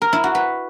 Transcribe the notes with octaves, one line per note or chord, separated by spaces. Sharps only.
A#4
E4
F#4
B4